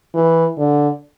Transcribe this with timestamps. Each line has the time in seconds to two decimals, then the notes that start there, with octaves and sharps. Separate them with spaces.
0.15 E3
0.58 D3